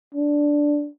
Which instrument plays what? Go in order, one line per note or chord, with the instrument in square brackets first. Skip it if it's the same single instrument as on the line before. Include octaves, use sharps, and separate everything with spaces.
[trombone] D4